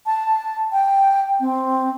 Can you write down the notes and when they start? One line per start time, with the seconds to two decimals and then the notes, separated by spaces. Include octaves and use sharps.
0.06 A5
0.72 G5
1.40 C4